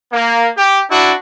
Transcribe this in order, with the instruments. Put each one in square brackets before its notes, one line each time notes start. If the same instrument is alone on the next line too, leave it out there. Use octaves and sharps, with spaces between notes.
[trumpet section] A#3
G4
D4 E4 F#4